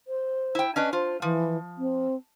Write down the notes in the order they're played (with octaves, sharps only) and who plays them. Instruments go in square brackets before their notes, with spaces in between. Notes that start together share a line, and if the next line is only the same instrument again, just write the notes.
[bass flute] C5
[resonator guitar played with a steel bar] E4 G5
[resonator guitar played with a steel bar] C#4 D4 B4 [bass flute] D#5
[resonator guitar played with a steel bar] F4 [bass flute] C5
[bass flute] E3 [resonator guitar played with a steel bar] F3
[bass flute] C4